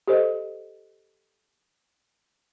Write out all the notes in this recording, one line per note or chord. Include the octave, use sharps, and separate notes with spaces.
G4 A4 C5 D#5